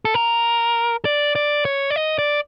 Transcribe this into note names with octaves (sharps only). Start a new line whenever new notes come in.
A4
A#4
D5
D5
C#5
D5
D#5
D5